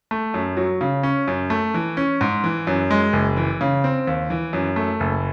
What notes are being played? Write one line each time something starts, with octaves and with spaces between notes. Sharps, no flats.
A3
F#2
F#3
C#3
C#4
F#2
A3
E3
C#4
G#2
E3
F#2
G#3
F#1
E3
C#3
C4
D#2
E3
F#2
A3
F#1